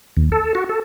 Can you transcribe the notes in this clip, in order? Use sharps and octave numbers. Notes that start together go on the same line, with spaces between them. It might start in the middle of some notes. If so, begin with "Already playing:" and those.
D#2
A4
F#4
A4